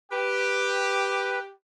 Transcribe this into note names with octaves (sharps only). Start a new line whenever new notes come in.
G4 B4